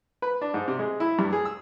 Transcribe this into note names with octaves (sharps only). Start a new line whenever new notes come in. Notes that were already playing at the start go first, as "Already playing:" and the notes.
B4
D4
G#2
C3
G#3
E4
G2
G#4
E6